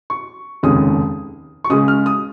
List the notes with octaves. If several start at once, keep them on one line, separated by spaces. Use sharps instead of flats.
C#6
F1 D#2 C#3 G#3 C#4 D#6
C#6
C#2 C#3 G#3 D#6
F6
D#6